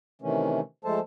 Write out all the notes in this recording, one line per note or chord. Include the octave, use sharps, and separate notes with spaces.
C3 D#3 E3 A3 C#4
F3 G#3 A3 A4 C5 A5